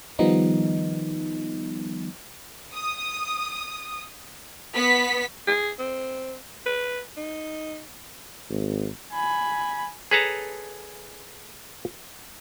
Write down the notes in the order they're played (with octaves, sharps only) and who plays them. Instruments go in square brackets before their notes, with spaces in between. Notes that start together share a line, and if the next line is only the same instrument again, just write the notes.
[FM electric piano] D#3 F3 G3 B3 D#4
[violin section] D#6
B3 B6
[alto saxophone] G#4
C4
B4
D#4
[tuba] G#1
[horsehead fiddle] G#5 B5
[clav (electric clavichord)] G#4 A4 B4 C#5 A5 A#5